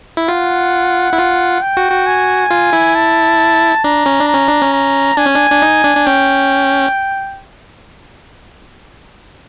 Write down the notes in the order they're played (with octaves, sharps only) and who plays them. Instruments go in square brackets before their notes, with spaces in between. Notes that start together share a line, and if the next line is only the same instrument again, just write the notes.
[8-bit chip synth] E4
[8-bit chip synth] F4 [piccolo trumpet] F#5
[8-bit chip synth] E4
F4
[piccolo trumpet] G5
[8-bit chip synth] F#4
F#4
[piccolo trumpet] G#5
[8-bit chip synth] F4
E4
[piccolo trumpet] A5
[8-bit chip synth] D4 [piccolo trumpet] A#5
[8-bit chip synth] C#4
D4
[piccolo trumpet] A#5
[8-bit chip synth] C#4
D4
C#4
[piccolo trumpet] A#5
[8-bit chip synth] D4 [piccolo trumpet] G#5
[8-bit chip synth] C#4
D4
D4
D#4
D4
D4
[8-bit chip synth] C#4 [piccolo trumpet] G5